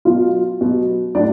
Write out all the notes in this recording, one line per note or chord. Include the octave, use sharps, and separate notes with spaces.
B2 F#3 F4
B2 F#3
A2 F#3 D4 D5